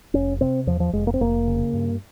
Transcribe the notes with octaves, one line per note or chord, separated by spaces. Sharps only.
F1 C#4
C3 C4
E2 F3
F3
F1 G#3
A#3
C4
F1 A#3
C#3
G2